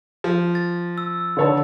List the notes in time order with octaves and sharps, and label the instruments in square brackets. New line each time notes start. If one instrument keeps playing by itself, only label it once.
[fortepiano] F3
[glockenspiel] A6
E6
[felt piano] D3 C#5 A5